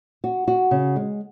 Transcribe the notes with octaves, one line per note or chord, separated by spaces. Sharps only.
F#4
F#4
C#3
G#3